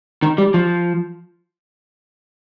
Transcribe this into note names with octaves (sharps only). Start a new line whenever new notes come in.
D#3
G3
F3